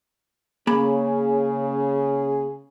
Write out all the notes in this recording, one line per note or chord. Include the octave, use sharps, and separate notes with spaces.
C#3 A#3 G#4 B5